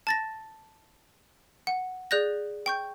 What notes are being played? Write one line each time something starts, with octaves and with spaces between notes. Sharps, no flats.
A5 A6 A#6
F#5
G#4 D5 F#6 G6 A#6
G5 C#6 G6